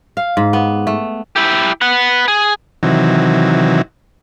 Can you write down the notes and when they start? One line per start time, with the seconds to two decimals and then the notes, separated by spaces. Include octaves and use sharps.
0.17 F5
0.37 G#2
0.53 B3
0.87 A3
1.36 E4 G4
1.81 B4 F#5
2.28 G#4
2.83 C3 D#3 E3 F#3